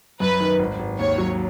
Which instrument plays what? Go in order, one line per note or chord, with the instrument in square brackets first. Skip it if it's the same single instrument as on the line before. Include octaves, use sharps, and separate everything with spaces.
[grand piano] F#2 [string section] B4
[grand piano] D#3
G#1
G#1
[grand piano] D#2 [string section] C#5
[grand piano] F#3